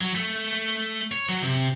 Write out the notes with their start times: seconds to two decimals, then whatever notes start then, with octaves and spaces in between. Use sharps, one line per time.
0.01 F#3
0.15 A3
1.12 C#5
1.29 F#3
1.42 C3